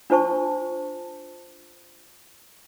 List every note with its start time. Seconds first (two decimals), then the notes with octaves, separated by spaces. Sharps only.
0.10 D4 F4 C5 A5 C#6